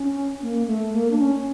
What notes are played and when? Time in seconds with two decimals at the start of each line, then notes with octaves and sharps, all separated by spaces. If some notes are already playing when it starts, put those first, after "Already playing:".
Already playing: C#4
0.42 A#3
0.67 A3
0.93 A#3
1.11 D4
1.19 C#4